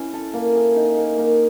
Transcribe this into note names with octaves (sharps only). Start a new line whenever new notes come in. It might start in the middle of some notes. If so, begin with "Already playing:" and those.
Already playing: C#4 E4
A4
A#3
G#4
D#4
A#3
A#3